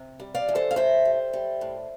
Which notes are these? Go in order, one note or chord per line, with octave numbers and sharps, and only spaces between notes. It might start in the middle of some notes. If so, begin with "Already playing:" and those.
Already playing: C3
G3
D5 F5
E3
A4 C5
F5
A2 C5 E5
G3
G3
A2